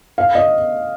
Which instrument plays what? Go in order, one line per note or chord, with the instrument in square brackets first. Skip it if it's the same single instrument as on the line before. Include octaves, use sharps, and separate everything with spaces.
[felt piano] F5
D#5